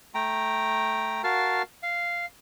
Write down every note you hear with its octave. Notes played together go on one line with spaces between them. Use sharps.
A3 G5 A#5
F#4 A#4 F5 A5
F5